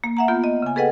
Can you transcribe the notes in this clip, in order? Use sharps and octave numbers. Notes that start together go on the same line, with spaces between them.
A#3
E5 F#5 A#5
B3 F4 G6
D#5
C#3 G#5
G#4 A4 B4 D#5 F#5 G5